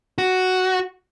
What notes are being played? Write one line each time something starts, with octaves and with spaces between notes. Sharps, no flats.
F#4